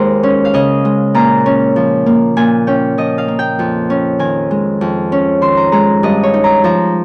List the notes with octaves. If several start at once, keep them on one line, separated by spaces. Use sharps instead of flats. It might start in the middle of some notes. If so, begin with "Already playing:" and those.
Already playing: D#2 G#3 A#4 C5
C#4
F5
C#3 D#5
G#3
A#2 A#5
C#4
F3
A#3
A#2 G#5
C#4 G5
F3 D#5
F5
A#3
G5
F2
C#4
D#3 G#5
G#3
F2
C#4
D#3 C6
A#5
G#3 A#5
G2 D#5
C#5
D#4
A#5
F3 A#5